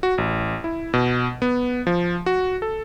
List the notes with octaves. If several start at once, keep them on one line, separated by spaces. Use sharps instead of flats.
F#4
A1
E4
B2
B3
F3
F#4
A4